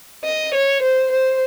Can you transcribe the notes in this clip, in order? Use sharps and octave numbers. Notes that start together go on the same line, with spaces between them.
D#5
C#5
C5
C5